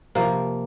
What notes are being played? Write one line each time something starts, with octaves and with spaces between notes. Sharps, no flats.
C3 F3 A#3